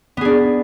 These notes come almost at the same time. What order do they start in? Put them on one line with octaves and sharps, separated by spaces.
B3 G#4 D4